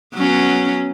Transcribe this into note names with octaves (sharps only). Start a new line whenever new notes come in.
F#3 B3 C#4